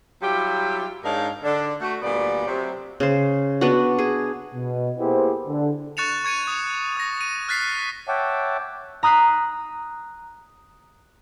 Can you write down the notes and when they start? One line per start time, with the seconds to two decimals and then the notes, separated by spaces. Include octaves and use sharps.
0.22 F#3 G3 E4 F4 G4
1.03 G#2 D4 D#4 A#4 C#5 F5
1.44 D3 D4
1.81 A3 F#4
2.02 D2 A#2 G3 B3 D5
2.47 C3 F#3
3.00 C#3 C5
3.61 B3 D4 F#4
3.99 G#4
4.55 B2
4.99 A#3 B3 E4 G4 G#4 C5
5.47 D3
5.97 C#6 F#6 A6 C#7 E7 F7
6.25 C#6 G#6 C#7 D#7
6.47 D#6
6.97 D#6 A#6
7.21 D#7
7.48 F6 F#6 A6 B6 C7
8.08 C#5 E5 F#5 G5 A5 D6
9.03 A#5 D#6 F#6 B6 C7